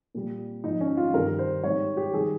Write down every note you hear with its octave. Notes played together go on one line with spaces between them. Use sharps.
A#2 G3
G#2 F3 D#4
C#4
F4
G2 D#3 G3 A#4
C5
G#2 G3 C#5
G4
D#3 G3 G#4